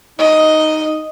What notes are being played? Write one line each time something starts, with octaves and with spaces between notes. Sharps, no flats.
D#4 D#5